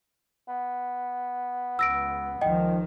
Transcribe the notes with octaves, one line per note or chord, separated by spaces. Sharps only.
B3
C#2 E6 A#6 D7
C#2 D#3 F3 D#5 G5